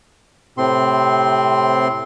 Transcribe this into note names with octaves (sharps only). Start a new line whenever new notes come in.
A2 C3 C4 C6